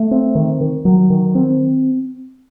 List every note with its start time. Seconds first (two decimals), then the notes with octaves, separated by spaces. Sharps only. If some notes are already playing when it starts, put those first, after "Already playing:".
Already playing: A3
0.11 C4
0.35 D#3
0.61 D#3
0.85 F#3
1.10 D#3
1.35 C4